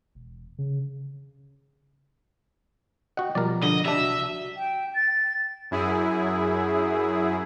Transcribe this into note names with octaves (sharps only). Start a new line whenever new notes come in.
E1
C#3
F#4 D#5 F#5 G5
B2 F3 G3 A#4 D5
D3 D#5
G3 D4 E5
C2 F#4
G5
A6
F#2 E4 G#4